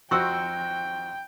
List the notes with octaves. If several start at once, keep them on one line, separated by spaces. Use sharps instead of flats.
F2 C4 F#4 G5 C#6 E6